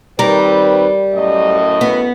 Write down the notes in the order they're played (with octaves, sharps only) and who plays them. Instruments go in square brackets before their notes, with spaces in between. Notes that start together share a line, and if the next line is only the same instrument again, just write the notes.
[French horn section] D#3 C4 B4 [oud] G3 A#4
[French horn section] F#2 A2 D#5
[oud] B3